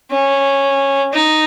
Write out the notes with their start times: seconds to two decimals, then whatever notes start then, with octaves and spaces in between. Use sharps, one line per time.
0.10 C#4
1.12 D#4